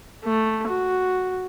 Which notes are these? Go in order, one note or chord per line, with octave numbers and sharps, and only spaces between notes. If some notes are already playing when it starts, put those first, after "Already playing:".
A3
F#4